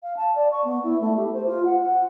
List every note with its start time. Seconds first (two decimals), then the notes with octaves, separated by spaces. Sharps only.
0.03 F5
0.17 A5
0.36 D5
0.52 C#6
0.64 B3
0.84 E4
1.01 A3
1.17 G4
1.34 C5
1.47 F4
1.65 F#5
1.81 F#5